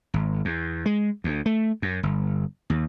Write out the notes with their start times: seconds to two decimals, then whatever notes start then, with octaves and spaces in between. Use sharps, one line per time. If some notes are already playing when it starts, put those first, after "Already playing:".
0.14 G#1
0.45 E2
0.86 G#3
1.24 D2
1.46 A3
1.82 F#2
2.03 G1
2.70 D#2